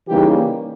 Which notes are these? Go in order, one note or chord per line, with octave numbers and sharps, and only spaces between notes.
C#3 E3 G3 A#3 D#4 G4